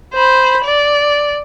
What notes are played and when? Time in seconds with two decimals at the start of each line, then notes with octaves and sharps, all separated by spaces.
0.14 C5 B5
0.64 D5